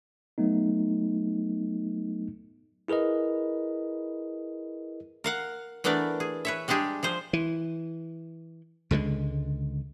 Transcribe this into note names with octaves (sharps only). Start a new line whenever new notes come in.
F#3 A3 B3 D#4
E4 G#4 A#4 B4 D#5
A#4 F5 F#5
E3 A3 B3 D4 A#4 D5
G#4
B4 C#5 E5
G3 G#3 D4 G4 G#4
F3 G#4 C5
E3
C#2 D3 F3 G#3